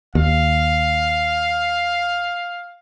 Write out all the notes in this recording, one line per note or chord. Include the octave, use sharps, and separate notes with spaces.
D#2 F5